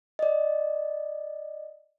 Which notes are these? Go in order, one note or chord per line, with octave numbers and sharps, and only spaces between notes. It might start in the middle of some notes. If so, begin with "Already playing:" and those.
D5 D#5